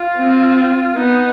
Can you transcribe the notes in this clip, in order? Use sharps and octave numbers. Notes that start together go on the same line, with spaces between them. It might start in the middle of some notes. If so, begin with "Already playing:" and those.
Already playing: F4
C4
B3 D#4